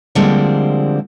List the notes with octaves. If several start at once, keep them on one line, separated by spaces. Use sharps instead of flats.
D3 F3 G3 G#3 A#3 C4